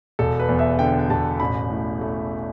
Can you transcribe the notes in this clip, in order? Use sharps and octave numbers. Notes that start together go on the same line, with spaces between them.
E1 A4
B4
E2
E5
D3 G5
G5
E1 A5
A1 B5
A2
A3